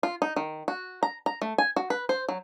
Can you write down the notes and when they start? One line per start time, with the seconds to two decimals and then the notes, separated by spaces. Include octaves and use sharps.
0.03 F4
0.22 D#4
0.36 D#3
0.68 F#4
1.03 A#5
1.26 A#5
1.42 A3
1.58 G#5
1.76 F#4
1.90 B4
2.09 C5
2.29 F#3